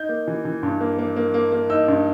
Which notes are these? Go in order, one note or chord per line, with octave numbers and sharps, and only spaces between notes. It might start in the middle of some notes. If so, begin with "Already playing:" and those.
Already playing: D#4 G6
A#3
E3
E3
G2
A#3
A#3
A#3
A#3
A#3
D#4 E6
G2